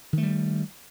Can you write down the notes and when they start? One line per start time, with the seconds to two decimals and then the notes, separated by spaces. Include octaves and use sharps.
0.13 D#3
0.18 A3
0.23 G3